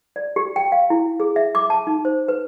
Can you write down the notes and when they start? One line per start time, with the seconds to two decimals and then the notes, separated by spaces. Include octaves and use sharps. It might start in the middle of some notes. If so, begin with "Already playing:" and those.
0.16 D5
0.36 G4
0.56 G5
0.72 F5
0.90 E4
1.20 G#4
1.36 E5
1.55 D6
1.70 A5
1.87 D#4
2.05 C5
2.28 B4